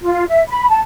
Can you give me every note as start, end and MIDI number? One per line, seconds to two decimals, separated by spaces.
0.01 0.24 65
0.28 0.42 76
0.48 0.69 83
0.69 0.81 81